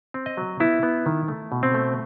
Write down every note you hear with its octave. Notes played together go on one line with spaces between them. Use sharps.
C4
D#5
F#3
B3 E4
B3
D#3
A3
B2
C4
A3